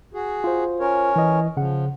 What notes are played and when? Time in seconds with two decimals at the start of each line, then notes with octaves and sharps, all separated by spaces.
0.14 F#4 G#4
0.44 F4 C5
0.80 C#4 A#4 C#5
1.16 E3 D#5
1.57 C#3 F3 F#5